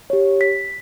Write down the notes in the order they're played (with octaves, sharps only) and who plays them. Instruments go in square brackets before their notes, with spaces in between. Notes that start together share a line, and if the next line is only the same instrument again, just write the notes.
[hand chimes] G4 C#5
B6